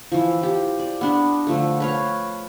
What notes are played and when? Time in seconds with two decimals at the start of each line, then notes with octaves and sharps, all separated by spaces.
0.12 E3 F3
0.41 F3 G4
0.79 D5
1.01 B3 D4
1.47 D3 F3 A3
1.80 B4 C#5 F5